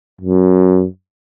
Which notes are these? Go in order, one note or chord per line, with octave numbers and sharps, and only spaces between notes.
F#2